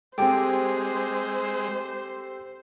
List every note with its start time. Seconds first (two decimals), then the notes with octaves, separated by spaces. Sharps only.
0.18 G#3 C4 G4 A4 C5 G5 A5 D6